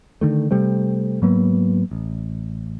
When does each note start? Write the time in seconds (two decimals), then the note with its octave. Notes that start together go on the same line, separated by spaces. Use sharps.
0.21 D3 D#3 A3
0.51 C3 G3 A3 C4
1.22 G#2 F#3 A#3 B3
1.91 A1